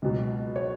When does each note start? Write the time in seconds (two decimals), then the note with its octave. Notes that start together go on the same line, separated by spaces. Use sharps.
0.02 C#2 B2 F#3
0.56 C#5